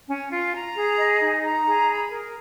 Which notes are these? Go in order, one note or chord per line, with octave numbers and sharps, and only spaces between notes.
C#4
F4
A#5
G#4
D#5
D#4
A#5
G#4
B5
A#4